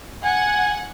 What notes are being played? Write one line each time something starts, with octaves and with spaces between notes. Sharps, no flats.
F#5 G#5